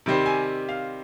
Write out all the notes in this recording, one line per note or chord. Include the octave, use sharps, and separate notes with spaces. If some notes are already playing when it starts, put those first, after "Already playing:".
C3 D#3 G3 C4
G#5
F5